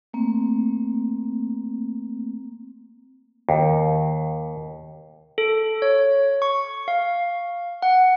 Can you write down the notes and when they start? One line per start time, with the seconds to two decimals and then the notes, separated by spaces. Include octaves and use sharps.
0.14 A3 A#3 C4
3.49 D#2
5.38 A4
5.82 C#5
6.42 C#6
6.88 F5
7.82 F#5